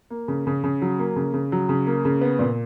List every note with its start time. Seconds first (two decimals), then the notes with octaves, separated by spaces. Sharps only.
0.10 A#3
0.28 C#3
0.47 C#3
0.64 C#3
0.82 F#3
0.99 A#3
1.16 C#3
1.34 C#3
1.52 F#3
1.69 C#3
1.87 A#3
2.05 C#3
2.21 B3
2.39 A#2